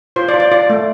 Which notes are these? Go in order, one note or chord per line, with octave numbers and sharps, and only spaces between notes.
F4 C5
D5
F4
D5
F4 D5
A3